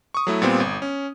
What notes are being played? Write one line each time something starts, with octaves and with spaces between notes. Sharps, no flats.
C#6 D#6
F#3 A3 E4
A#2 G3 B3 C4
G1
C#4